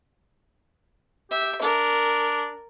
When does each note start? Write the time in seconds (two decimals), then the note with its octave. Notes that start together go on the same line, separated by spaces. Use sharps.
1.31 G4 E5
1.61 D4 A#4